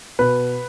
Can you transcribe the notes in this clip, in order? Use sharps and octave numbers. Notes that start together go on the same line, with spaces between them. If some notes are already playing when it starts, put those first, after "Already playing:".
B2 B4